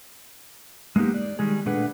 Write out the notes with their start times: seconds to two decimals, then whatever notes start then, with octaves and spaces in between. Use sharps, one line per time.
0.96 G#3 A#3 B3 D#4 G4
1.14 D5
1.39 D#3 G3 G#3 G#4
1.66 A#2 A3 D4 G#4 B4 F#5